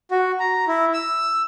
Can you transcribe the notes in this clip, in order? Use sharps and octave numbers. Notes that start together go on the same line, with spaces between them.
F#4
A#5
E4
E6